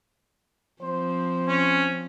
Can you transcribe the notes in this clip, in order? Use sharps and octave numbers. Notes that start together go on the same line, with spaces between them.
F3 C4 C5
C#4